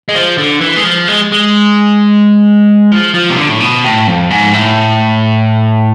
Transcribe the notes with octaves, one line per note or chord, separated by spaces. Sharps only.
G#3
F3
D3
E3
G#3
F3
G#3
G#3
F3
F3
C3
D3
A2
B2
A2
F2
G#2
A2